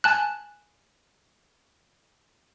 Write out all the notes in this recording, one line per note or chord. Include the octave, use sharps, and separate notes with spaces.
G#5 A5 F#6